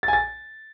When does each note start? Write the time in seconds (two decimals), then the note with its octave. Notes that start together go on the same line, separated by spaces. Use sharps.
0.03 A6
0.08 G#5
0.13 A6